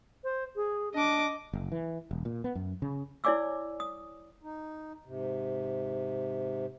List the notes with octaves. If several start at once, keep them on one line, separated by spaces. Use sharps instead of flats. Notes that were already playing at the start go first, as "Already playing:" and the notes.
C5
G#4
D4 D#5 D6
F#1
E3
E1
A#2
B3
F#2
C#3
E4 C#5 D5 G#5 D6 E6
D#6
D#4
G#2 C3